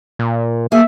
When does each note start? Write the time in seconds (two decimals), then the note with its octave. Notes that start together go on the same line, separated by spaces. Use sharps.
0.19 A#2
0.72 A#3 G#4 E5